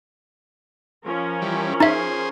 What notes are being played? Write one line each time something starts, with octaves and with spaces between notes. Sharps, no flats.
F3 C#4 A#4
E3 G3
D#4 G#4 C5 E5